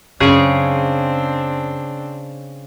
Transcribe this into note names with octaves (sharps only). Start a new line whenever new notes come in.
F#2 C#3 C4 D4 G#4